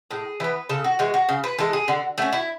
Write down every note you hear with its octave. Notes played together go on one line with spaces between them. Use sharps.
A2 G#4
E3 B3 B4
C#3 A4
F#4
E3 G#3 F#4
F#4
C#3
B4
E3 G#3 A4
G#4
D3 F#4
A3 C#4 F#4
E4